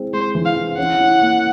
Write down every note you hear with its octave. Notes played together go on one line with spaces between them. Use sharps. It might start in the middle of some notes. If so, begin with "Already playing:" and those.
Already playing: G#3 C4 E4
G#3 C5
E3
F5
E4
C#4 F#5
E4
A#3